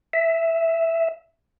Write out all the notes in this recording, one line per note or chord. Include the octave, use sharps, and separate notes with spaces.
E5